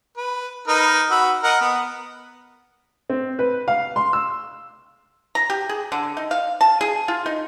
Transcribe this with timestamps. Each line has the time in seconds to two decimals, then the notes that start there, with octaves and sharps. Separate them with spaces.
0.17 B4
0.67 D#4 A#4 B4
1.11 F#4 B5 E6
1.43 A#4 D#5 F#5
1.61 B3 B5
3.10 C4
3.39 B4
3.68 F5
3.96 C6
4.13 E6
5.35 A#5
5.50 G4
5.69 G#4
5.92 D3
6.17 D#4
6.31 F5
6.61 A5
6.81 G#4
7.08 F4
7.26 D#4